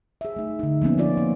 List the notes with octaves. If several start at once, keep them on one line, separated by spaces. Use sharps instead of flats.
G#4 E5
A3 D#4
D3 D#4
F3 A#3 B3 C#4
F3 B3 C4 F4 D5
A#3